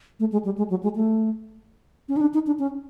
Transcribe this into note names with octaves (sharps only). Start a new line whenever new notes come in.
A3
G#3
G3
G#3
F#3
G#3
A3
C#4
D#4
D4
D#4
D4
C#4